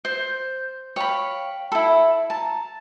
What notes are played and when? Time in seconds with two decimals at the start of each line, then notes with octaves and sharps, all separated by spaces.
0.05 C5 G6
0.96 C#5 F5 G5 B5
1.72 E4 A4 B5
2.30 A5 A#5